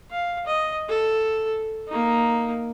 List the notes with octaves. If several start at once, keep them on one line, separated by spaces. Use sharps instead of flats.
F5
D#5
A4
A#3 D#4